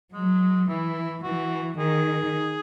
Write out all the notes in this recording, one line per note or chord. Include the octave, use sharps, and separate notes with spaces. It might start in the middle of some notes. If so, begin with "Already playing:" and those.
F#3 G#3
E3 E4
E3 F#4
D#3 G#4